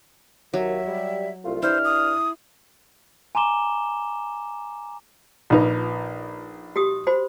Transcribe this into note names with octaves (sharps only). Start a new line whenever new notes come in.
D#2 F#3 E5
G3
C2 A3 F4
G2 D4 E4 C5 F6
D#6
G#5 A#5 C6 D6 E7 G7
A#1 D#4 F4 B4
F#4 G4 D#6
F#4 C5 B5